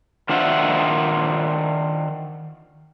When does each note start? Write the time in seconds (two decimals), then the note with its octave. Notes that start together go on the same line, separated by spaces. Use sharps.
0.29 D#3 D4 F4 C5 E5 F#5